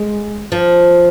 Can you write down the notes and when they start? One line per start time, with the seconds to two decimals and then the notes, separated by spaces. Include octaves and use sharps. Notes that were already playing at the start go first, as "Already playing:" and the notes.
Already playing: G#3
0.52 F3